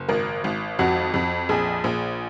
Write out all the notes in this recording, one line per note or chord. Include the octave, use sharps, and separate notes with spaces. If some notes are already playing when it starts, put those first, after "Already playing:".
Already playing: F#1
G#1 A#4
G#1
F2 F#4
F2
A#1 G#4
A#1